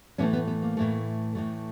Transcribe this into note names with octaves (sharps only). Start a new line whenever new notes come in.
A2 E3 A3 B3 C#4
B3
B3
A#3
A2 E3 A3
A2 E3 A3